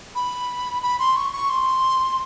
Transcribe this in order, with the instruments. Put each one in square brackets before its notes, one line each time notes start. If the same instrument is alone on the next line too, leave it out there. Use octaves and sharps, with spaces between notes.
[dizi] B5
B5
C6
C#6
C#6
C6